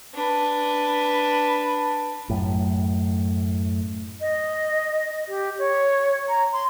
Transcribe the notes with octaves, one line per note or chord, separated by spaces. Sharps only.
D4 B4
F#2 A2
D#5
G4
C#5
A#5
C6